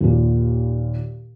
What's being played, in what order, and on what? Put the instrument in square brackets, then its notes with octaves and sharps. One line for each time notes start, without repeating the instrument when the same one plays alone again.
[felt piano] D#2 A#2